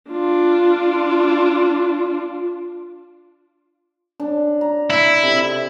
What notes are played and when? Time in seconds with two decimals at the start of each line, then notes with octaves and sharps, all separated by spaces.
0.11 D4 F4
4.20 D4
4.61 A#5
4.90 E4
5.23 C3 A4